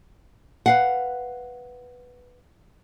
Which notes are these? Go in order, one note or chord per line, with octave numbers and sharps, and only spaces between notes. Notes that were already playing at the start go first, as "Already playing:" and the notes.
B4 F5 F#5